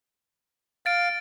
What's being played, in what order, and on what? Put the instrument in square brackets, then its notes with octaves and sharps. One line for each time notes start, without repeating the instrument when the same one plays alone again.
[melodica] F5 [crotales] A6 D7